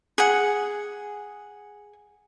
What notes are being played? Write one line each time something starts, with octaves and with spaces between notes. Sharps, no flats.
G#4 F#5